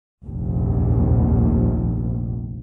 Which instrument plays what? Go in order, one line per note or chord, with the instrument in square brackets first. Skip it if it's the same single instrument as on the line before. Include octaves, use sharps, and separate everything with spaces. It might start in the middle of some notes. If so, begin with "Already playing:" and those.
[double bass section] F1 A#1 D#2